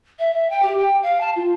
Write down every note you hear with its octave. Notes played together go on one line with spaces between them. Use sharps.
E5
E5
G5
G4
G5
F5
A5
F4